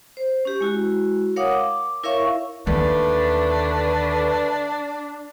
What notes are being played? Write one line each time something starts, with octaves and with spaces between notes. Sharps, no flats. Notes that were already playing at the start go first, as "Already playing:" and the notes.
C5
C#4 G4
G#3 E4 F#4
A#4 C#5 F5 F#5 D6 D#6
D6
E4 A#4 C#5 E5 F5 C#6
D#2 D3 A3 D4 B4